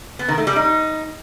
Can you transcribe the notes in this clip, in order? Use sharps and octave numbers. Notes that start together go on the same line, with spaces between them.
B3
D#3
A3
G3
D#4